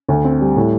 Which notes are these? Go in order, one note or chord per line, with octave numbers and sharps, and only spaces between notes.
D2
C4
G3
A2